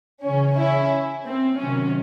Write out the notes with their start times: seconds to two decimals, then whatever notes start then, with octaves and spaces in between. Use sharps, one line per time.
0.23 C#3 E3 C#4
0.57 C#4 E4
1.25 C4
1.58 C3 D#3 F#3 C#4